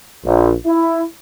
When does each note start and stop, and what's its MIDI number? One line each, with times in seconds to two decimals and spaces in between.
0.24 0.51 34
0.66 1.02 64